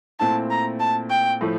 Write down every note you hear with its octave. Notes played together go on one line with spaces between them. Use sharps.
A#2 A3 C4 E4 A5
A#5
A5
G5
A2 F3 A3